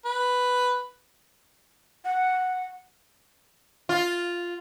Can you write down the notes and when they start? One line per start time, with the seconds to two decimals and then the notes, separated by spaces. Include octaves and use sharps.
0.05 B4
2.05 F#5
3.89 F4